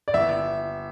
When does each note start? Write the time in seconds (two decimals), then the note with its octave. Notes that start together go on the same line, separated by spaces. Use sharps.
0.08 D5
0.14 G1 E5